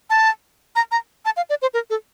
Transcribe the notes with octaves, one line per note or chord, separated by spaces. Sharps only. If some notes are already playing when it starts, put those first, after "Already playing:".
A5
A#5
A#5
A5
F5
D5
C5
A#4
A4